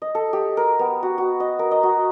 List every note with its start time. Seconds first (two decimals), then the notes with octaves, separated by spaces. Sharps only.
0.02 D#5
0.15 A4
0.33 G4
0.57 A#4
0.79 B3
1.03 F#4
1.18 F#4
1.40 D#5
1.59 A#4
1.71 D#5
1.83 F#4